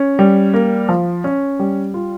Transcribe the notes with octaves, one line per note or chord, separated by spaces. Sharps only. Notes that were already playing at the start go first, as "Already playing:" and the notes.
Already playing: C#4
G3
A#3
F3
C#4
G3
F4